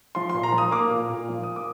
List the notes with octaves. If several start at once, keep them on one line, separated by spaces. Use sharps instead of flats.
F3 C6
A#2 C6
A#5
F3
D#6
A#3 D6
A#2
A#2
F3
A#3 D#6
D6